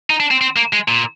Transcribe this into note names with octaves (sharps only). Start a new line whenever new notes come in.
D#4
D4
C4
C4
A#3
G#3
A#2